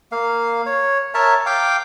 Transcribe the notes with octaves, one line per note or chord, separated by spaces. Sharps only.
A#3 F5
C#5
A#4 C#5 E5 A5
F5 G5 D6